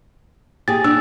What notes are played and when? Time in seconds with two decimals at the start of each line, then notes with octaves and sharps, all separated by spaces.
0.68 G4 G#4 A6
0.84 D4 E6